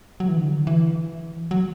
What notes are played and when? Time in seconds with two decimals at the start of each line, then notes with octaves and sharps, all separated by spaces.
0.20 F#3
0.28 E3
0.37 D3
0.67 E3
1.51 F#3